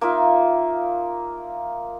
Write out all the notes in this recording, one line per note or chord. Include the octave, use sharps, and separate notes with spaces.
A#3 D#4 F4 E5